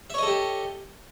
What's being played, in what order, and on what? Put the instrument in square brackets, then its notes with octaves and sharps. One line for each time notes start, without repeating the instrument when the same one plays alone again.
[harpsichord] E5
C#5
D#5
A4
G4